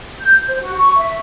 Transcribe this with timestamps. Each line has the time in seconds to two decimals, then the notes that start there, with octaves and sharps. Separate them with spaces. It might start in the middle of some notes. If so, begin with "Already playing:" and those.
0.21 G6
0.48 C5
0.61 F#4
0.75 C#6
0.97 E5